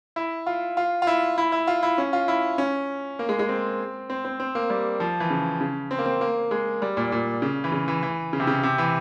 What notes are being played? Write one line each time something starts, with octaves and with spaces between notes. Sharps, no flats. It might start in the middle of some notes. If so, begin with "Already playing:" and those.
E4
F4
F4
F4
E4
E4
E4
F4
E4
C#4
F4
E4
C#4
A#3
G#3
G#3
C4
C4
C4
C4
A#3
G3
F3
E3
C#3
C#3
C4
A#3
C4
A#3
G#3
G3
A#2
A#2
C#3
E3
C#3
E3
E3
C#3
C3
C#3
C3
E3